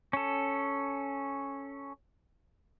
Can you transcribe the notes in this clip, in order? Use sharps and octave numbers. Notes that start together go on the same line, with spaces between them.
C#4 A4